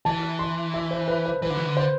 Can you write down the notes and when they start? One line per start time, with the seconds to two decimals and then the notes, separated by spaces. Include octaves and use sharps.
0.05 E3 A5
0.39 C6
0.74 E5
0.91 C5
1.08 B4
1.26 C5
1.42 E3 B4
1.50 D3
1.57 E3
1.65 D3
1.77 C5